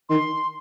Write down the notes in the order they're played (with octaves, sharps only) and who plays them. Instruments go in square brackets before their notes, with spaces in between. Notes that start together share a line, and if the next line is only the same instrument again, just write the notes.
[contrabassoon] D#3 [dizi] C6